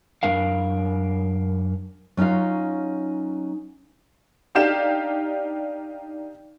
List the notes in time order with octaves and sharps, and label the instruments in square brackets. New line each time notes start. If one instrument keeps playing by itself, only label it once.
[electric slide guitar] F#2 D4 A#4 F5
[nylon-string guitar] F#3 C#4 D#4 F4 F5
[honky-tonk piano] D4 D#4 G4 F5 G6 E7